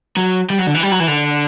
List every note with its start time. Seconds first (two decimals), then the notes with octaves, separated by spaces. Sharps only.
0.17 F#3
0.50 G3
0.59 F#3
0.67 D3
0.75 E3
0.83 G3
0.92 F#3
1.00 E3
1.08 D3